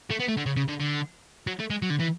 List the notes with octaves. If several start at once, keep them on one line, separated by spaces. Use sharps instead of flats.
A3
B3
A3
D3
C#3
C#3
D3
D3
F#3
A3
G#3
F#3
D3
E3